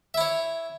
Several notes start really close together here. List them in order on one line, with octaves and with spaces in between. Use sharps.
E5 E4 C#5